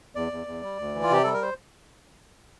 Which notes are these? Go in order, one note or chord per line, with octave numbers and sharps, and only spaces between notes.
E2 D5
E2
E2
G3
D2
E3
F4
C3 G4
G3 A4
A#4
C5